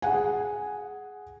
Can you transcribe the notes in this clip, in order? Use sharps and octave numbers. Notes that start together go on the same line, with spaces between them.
G#4 F#5 G#5